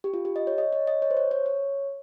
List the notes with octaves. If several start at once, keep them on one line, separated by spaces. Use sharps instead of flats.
G4
F4
G4
D#5
C#5
D#5
C#5
D#5
C#5
C5
C#5
C#5
C#5